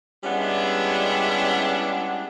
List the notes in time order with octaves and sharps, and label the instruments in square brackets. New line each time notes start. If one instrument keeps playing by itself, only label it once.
[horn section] G3 G#3 B3 C#4 D4 E4